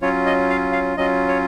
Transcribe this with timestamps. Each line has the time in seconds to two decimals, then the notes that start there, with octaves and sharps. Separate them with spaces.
0.02 F#3 C#4 F4 C#5
0.26 D#5
0.50 F5
0.72 F5
0.97 F#3 C#4 F4 D#5
1.28 C#5